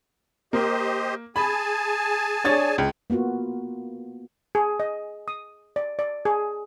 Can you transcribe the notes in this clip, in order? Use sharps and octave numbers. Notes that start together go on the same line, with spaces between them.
A#3 G4 C5 D#5
G#4 G#5 A5 B5
D4 C#5 A6
C#2
A#3 B3 F4 F#4
G#4
D#5
D#6
D5
D5
G#4